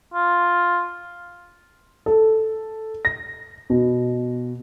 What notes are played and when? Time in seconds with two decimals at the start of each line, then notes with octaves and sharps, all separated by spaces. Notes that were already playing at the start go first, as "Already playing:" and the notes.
0.14 F4
2.06 A4
3.05 A#6
3.70 B2